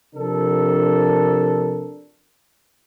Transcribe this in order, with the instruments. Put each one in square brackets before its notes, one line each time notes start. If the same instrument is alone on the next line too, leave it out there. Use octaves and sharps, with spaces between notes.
[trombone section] C3 F3 D4 A4 A#4